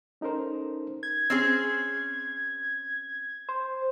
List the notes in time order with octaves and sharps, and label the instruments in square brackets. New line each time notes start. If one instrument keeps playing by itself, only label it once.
[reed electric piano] C#4 D#4 A4 A#4 C5
[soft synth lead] G#6
[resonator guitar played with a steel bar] C4 C#4 G#4
[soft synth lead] C5